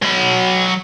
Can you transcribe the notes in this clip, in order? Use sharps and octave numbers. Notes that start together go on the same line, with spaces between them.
F#3 B5